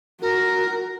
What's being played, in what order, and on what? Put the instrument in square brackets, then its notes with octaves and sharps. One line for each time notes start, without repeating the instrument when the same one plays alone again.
[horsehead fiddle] F#4 [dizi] A#4